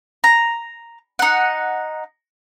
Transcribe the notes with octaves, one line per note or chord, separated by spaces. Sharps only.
A#5
D#4 F#5